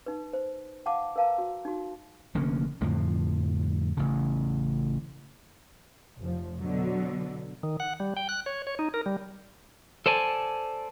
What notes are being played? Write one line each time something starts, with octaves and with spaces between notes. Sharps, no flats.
D#4 B4
C5
F5 F#5 A5 D6
A#4 B4 F5 A5 A#5
F#4
D#4 F#4
F1 D3 A#3 C#4
F2 A2 D3 F3
A1 C#3
F1 F3
B2 D3 F#3
D#3
F#5
G3
G5
F#6
C#5
C#5
D#4
A#4
G3
A4 C5 D5 G#5 A5